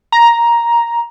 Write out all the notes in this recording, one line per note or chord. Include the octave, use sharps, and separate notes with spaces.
A#5